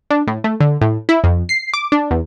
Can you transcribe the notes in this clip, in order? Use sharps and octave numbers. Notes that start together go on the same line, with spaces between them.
D4
A2
A3
D3
A2
E4
F2
C7
D6
D4
E2